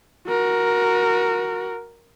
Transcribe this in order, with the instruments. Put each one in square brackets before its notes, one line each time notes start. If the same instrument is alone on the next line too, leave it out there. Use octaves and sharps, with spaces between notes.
[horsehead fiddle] F#4 A#4